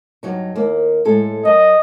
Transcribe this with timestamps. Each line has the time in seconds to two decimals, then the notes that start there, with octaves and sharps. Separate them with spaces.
0.23 G2 F#3 D#4
0.56 D#2 A#3
1.05 A2 G#3 A4
1.45 F#2 D#5